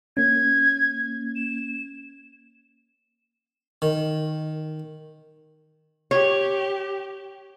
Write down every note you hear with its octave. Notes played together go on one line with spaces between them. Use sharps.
A#3 C#4 G#6
E7
D#3
G4 C#5